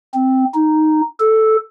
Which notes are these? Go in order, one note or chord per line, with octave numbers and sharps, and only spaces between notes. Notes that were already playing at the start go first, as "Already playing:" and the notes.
C4
D#4
A4